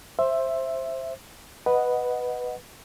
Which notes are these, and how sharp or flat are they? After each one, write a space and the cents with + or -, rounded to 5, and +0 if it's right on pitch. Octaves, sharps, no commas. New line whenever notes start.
C5 +15 E5 +5
B4 +0 D#5 +0 F#5 +0